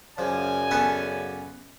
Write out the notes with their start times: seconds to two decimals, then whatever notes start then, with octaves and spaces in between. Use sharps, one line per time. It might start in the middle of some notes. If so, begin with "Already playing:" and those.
0.18 F#2 C#3 F3 D5 G#5
0.71 B3 C#4 A4